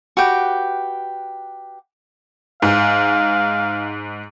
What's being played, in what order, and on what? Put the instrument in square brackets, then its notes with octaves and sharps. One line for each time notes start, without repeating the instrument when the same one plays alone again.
[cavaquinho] F#4 G4 B4 G5
[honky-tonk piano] G#2 [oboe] F5